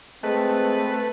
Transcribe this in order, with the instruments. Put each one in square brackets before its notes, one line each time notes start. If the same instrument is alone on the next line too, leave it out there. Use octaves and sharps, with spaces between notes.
[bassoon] G#3 [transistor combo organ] A3 [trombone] C4 [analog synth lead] B4